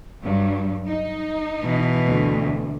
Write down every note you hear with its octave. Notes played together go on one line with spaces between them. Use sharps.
G2 F#3 G3
D#4
B2 E3
D2